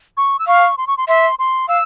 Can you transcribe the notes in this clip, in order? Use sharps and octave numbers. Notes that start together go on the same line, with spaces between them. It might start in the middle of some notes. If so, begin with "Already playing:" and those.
C#6
E6
F5 C#6
C6
C#6
C6
E5 C6
C6
F5 E6